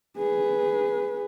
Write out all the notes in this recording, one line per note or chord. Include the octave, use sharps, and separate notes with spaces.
G#4 B4